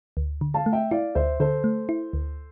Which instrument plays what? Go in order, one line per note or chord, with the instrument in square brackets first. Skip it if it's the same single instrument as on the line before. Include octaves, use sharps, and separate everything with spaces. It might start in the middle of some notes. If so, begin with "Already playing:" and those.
[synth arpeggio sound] D2
D3
[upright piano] F5 A5
[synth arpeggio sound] A3
[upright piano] E5 G5
[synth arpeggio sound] E4 [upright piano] D5 F5
[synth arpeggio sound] D2 [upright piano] C5 E5
[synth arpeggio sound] D3 [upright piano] A4 C5
[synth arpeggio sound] A3
E4
D2